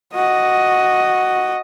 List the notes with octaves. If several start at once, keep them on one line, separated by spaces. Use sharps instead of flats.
F#4 D#5